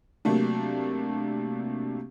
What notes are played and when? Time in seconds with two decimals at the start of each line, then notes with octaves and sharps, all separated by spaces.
0.25 C3 F#3 A3 A#3 D4